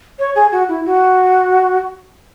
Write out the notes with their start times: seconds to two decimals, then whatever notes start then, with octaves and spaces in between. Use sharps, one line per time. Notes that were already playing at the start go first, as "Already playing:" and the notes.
0.19 C#5
0.35 G#4
0.52 F#4
0.69 E4
0.86 F#4